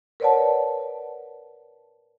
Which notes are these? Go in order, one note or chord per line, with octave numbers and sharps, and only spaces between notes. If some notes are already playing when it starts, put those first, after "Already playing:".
A#4 B4 C#5 D5 F#5 A5